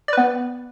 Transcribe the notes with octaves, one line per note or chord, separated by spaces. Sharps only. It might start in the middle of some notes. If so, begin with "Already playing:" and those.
B3 B4 D5